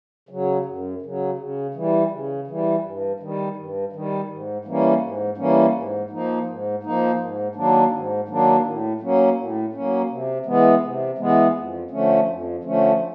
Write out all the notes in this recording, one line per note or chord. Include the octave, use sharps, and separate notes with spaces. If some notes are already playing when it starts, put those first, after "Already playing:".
C#3 F#3
F#2
C#3 F#3
C#3
E3 G3
C#3
E3 G3
G2
D#3 G3
G2
D#3 G3
G#2
E3 G3 A#3 C#4
G#2
E3 G3 A#3 C#4
G#2
F3 A#3 D#4
G#2
F3 A#3 D#4
G#2
D#3 F#3 A#3 D4
G#2
D#3 F#3 A#3 D4
A2
F#3 A#3 C#4
A2
F#3 A#3 C#4
C3
E3 G#3 B3
C3
E3 G#3 B3
F2
D3 F3 A3 C#4
F2
D3 F3 A3 C#4